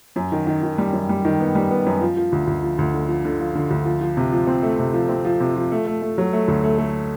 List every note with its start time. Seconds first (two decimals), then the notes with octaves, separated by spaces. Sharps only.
0.16 F#2
0.32 D#3
0.47 D#3
0.63 D#3
0.78 G3
0.93 F#2
1.09 G3
1.25 D#3
1.40 B3
1.55 G3
1.71 B3
1.86 F#2
2.01 F3
2.17 F3
2.32 D2
2.47 D2
2.63 F3
2.78 D2
2.94 D3
3.08 F3
3.25 D3
3.40 F3
3.55 D3
3.70 D2
3.86 F3
4.01 F3
4.17 C3
4.32 F3
4.47 C4
4.63 A3
4.79 C3
4.94 F3
5.09 C4
5.25 F3
5.40 C3
5.56 F3
5.72 A3
5.87 A3
6.02 A3
6.18 F#3
6.33 A3
6.48 D2
6.63 A3
6.78 A3